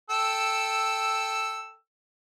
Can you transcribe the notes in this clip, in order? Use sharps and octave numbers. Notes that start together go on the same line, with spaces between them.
A4 G5 E6